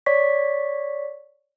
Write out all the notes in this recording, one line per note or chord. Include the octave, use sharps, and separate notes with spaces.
C#5 D5 C#6 B6